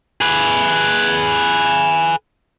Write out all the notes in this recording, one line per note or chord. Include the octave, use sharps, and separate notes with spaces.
G#4 B4